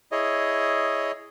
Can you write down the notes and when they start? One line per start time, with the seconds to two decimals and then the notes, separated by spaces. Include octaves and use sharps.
0.12 E4 G#4 C#5 D#5